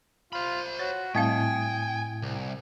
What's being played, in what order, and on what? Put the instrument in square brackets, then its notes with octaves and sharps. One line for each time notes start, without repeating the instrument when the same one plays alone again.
[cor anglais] F4 [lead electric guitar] C5 B5
[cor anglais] F#4 [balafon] C#5
[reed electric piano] A2 E4 D#6 [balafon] G3 C4 F5 [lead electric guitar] G5 [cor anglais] G#5
[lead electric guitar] C2